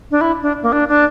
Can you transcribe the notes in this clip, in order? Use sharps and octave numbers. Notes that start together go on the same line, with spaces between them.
D4
E4
D4
A#3
D4
D4